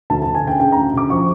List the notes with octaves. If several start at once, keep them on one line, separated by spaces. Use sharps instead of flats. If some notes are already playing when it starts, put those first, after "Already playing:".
D2 A5
D2 A5
G#5
C#3 G5
C#3 G5
D2 A#5
C#3 D6
F3 C#6